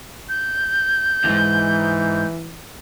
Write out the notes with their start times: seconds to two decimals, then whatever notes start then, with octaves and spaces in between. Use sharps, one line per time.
0.29 G6
1.25 D#2 G#2 E3